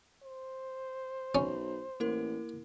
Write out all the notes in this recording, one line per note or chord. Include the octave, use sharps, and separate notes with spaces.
C5
B1 C#4
A1 A#3 E4 A#4